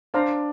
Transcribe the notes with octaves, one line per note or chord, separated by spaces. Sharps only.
D4 C5 F5 A#5